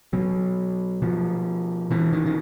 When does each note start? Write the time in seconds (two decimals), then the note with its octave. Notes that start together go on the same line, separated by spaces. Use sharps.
0.13 B2 F#3
1.02 B2 F3
1.91 B2 E3
2.13 D#3
2.26 D#3